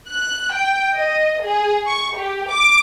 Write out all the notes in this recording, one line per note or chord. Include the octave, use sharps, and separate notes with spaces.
F#6
G5
D#5
G#4
C#6
G4
D6